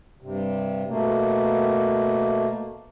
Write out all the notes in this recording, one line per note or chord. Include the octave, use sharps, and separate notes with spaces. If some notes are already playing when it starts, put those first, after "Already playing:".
G2 C3
B2 A3 A#3